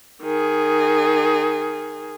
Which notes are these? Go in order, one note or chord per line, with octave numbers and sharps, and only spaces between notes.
D#3 G#4